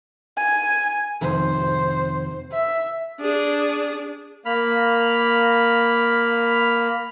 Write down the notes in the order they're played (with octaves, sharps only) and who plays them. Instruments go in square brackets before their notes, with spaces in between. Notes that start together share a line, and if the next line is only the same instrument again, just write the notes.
[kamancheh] G#5
[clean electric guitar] F2 C3 D#3 [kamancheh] C5
[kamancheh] E5
[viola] D4 G#4
[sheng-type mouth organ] A#3 B5 F6